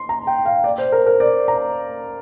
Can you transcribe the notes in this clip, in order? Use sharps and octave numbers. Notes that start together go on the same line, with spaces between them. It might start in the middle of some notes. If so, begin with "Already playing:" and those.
Already playing: C6
A#5
G5
F5
D5
C5
A#4
A#4
D5
A#5